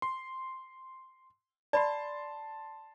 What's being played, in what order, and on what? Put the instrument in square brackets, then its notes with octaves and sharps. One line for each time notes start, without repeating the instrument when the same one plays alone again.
[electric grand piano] C6
[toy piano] D5 B5 [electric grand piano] A5 C6